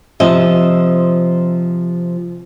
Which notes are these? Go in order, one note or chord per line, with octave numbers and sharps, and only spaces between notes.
C3 F3 D#5 E5